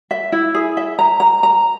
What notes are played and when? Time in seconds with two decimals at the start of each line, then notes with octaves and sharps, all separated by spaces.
0.11 E5
0.32 E4
0.54 G#4
0.77 E5
0.99 A#5
1.20 A#5
1.43 A#5